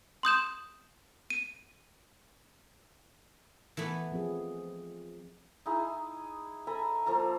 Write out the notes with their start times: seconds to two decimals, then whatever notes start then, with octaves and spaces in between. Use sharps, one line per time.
0.23 C6 D#6 G6 E7
1.30 D#7
3.77 E3 A3 B3
4.12 F3 C4 G#4
5.66 D#4 E4 G#4
6.67 A4 G#5 A#5 B5
7.06 F3 A#3 A4 A#5